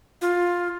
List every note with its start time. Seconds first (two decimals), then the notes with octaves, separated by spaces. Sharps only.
0.22 F4